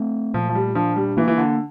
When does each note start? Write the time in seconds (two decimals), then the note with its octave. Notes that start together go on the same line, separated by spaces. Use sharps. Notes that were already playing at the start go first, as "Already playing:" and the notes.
Already playing: A3 C4
0.34 A#2 F3
0.49 F3
0.55 G3
0.75 F3 D4
0.96 G3
1.17 E3 A#3
1.28 E3
1.38 D3